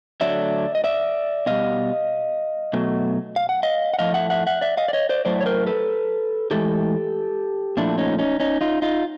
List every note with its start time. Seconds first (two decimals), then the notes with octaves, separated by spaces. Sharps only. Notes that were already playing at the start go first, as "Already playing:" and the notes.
0.21 D3 F#3 A3 D5 E5
0.75 D#5
0.84 D5 E5
1.46 B2 G3 D#5 F5
2.73 B2 F#3 A3
3.36 F5
3.49 F#5
3.63 D#5 F5
3.93 F#5
3.99 A2 F3 A3 D#5 F5
4.14 E5 F#5
4.30 E5 F#5
4.47 E5 F#5
4.61 D5 E5
4.77 D#5 F5
4.88 D5
4.93 C#5 D#5
5.09 C5 D5
5.25 A2 F#3 A3 C5 D5
5.41 C#5
5.46 A#4 C5
5.67 A4 B4
6.51 A2 E3 G#3 G4 A4
7.77 A#2 F3 A3 D4 E4
7.98 C#4 D#4
8.19 C#4 D#4
8.40 C#4 D#4
8.61 D#4 F4
8.82 D#4 F4